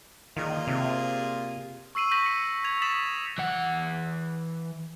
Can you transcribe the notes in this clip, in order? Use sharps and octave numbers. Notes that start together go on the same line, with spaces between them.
A#2 D#3 F4 G#4
C3
C#6 E6 C7 D#7 F#7
C#6 G6 A#6 B6 D#7 F#7
C#7
G#6 F7
D#6 A6 B6 E7 F#7
E3 F#5